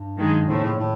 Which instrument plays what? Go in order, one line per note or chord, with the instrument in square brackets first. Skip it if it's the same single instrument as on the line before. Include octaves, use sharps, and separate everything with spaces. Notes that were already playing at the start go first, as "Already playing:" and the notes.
Already playing: [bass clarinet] G2
[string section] F#2 D#3 G#3
[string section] D#2 C#3 F3 A3 [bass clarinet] A2
[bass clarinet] A2
A2